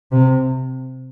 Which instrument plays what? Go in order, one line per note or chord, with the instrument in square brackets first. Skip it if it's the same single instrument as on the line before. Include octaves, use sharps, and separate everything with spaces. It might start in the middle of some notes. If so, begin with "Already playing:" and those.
[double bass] C3